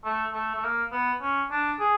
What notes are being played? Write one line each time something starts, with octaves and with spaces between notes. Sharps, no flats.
A3
A3
A3
A#3
B3
C#4
D4
G#4